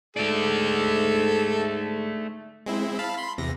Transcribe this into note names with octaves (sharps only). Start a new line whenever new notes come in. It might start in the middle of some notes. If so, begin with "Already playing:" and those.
G#2 A3 A4 D5
G#3 C4 E4
F5 A5 B5
B5 C6
E2 C3 A#6